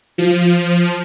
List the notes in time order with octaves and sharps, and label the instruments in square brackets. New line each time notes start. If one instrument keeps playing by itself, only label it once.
[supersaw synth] F3